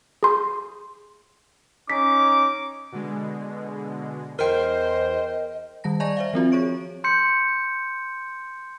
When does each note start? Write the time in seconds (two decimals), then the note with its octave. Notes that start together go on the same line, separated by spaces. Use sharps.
0.23 G#4 C6
1.90 C#4 D#4 D6 B6
2.92 B2 D3 G#3
4.39 E2 A#4 C5 D#5 G5
5.84 D#3 G3 A5 A#6
6.00 D5 D#5 G#5 A#5 C#6 A#6
6.17 C5 E5 F5
6.34 F3 C4 F4 F#4
6.52 G#4 C#5 C#6 D7
7.04 C6 G6 C#7